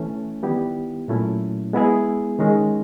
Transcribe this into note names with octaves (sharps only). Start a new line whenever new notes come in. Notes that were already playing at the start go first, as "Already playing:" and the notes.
Already playing: E3 A3 C#4
D#3 G3 B3 E4 G4
A#2 F#3 A3 C#4 E4
G#3 B3 E4 G#4
D#3 G#3 C#4